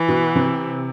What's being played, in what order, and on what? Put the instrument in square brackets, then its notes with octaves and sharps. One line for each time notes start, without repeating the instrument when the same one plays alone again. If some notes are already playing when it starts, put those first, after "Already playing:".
Already playing: [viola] E3
[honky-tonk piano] B2 B3
C3 C4